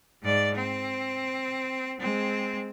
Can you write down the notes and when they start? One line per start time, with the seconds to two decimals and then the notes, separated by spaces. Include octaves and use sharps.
0.22 G#2 D5
0.56 C4
2.00 G#3 C4